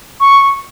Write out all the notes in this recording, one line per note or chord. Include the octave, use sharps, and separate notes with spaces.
C#6